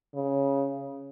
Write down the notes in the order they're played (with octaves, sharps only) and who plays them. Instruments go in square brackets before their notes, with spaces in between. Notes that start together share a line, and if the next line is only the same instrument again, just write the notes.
[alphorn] C#3